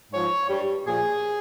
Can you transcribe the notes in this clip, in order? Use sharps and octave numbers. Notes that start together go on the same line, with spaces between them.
G#2 F3 C#5
G2 G3
A#2 F3 G#4